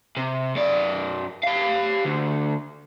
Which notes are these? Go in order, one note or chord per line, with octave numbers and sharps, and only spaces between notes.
C3
F#2 D5
G4 F5
D2